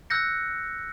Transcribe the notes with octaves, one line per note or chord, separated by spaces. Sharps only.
E6 F#6 G6 A#6 C#7